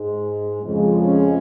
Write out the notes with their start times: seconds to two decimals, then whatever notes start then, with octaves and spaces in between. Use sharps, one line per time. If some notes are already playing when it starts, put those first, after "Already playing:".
Already playing: G#2 G#3
0.63 F2 C#3 F3 G#3
1.06 C#4